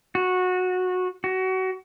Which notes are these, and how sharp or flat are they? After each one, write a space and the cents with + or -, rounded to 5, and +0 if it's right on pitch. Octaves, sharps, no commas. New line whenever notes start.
F#4 -15
F#4 +25